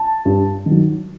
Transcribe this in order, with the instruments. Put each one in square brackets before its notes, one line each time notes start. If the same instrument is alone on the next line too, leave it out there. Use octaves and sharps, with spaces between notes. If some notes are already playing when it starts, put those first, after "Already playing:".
Already playing: [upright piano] A5
G2
D#3
F#3